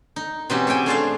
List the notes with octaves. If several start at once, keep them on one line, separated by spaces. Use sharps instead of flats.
D#4
B2 E3 C4 C#4 D#4 G4
G#4 C#5 E5 G5 G#5
A3 D4 G#4 C5 D5 F5